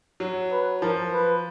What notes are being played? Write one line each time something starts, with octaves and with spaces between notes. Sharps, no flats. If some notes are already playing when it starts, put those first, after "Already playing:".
F#3
B4
F3 A#4
B4